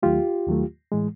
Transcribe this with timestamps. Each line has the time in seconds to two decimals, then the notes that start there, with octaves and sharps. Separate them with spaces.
0.03 D#2 D#3 F#3 A3 F4 G4
0.47 D#2 D#3 F#3 A3
0.92 A2 E3 G#3